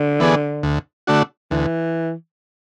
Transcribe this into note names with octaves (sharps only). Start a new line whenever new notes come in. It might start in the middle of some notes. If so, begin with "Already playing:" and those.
Already playing: D3
E3 B3 D4 G#4
D2
D3 A3 D4 F#4
D2 E3